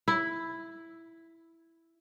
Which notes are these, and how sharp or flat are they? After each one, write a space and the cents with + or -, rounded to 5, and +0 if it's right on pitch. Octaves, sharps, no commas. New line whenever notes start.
E4 +0